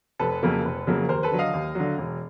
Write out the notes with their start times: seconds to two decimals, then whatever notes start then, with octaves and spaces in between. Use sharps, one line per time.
0.19 F1 A4 B4
0.43 F2 C#3 F#3 A#3
0.65 F1
0.87 F2 C#3 F#3 A#3
1.08 D#2 A#4 C5
1.23 A4 B4
1.31 D3 F#3
1.39 D#5 F5
1.54 D#2
1.75 D3 F#3
1.98 E1